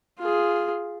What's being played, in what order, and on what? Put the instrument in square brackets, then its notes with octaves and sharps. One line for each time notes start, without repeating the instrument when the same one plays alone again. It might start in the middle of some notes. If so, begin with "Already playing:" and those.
[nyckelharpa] F4 G#4